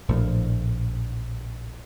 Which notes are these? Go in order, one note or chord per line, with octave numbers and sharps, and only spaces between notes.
A#1 A2 E3 F3